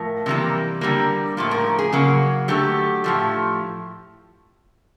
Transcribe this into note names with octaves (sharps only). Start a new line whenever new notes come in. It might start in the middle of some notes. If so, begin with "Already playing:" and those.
Already playing: A2 F3 A3 A#4
C3 E3 G3 A#3
D3 G3 A#3
A2 F3 A#3
A#4
G#4
C#3 F#3 A#3
D3 F#3 A3 G4
A2 F3 A3